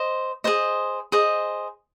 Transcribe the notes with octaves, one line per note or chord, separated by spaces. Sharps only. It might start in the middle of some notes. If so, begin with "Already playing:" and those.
Already playing: C5 D#5
G#4 C5 D#5
G#4 C5 D#5